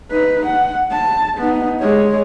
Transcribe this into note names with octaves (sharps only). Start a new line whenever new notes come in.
D#4 B4
F#5
A5
B3 D#4
G#3 C#5